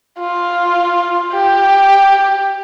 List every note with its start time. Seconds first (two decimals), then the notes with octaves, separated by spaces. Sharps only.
0.19 F4
1.33 G4